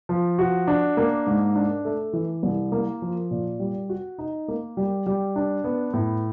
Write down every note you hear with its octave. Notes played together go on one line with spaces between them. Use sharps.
F3
F#4
D4
A#3
G#2
D4
A3
E3
C2
A#3
F3
A#2
G3
F#4
D#4
A#3
G3
G3
D4
B3
A2